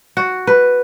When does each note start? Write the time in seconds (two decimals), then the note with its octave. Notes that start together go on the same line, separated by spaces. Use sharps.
0.17 F#4
0.47 B4